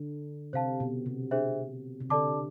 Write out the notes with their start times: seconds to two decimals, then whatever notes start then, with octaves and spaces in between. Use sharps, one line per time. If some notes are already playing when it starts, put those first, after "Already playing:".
Already playing: D3
0.53 C3 C5 F5 A5
0.80 B2
1.06 C3
1.31 D4 G#4 C5 E5
2.00 C3
2.10 D3 A4 D5 A5 D6